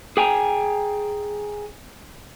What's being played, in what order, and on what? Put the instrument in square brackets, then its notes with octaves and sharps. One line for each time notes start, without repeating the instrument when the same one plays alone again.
[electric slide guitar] G#4 G5 G#5 A#5